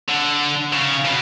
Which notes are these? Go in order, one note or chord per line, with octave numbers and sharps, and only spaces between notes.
D3
C#3
B2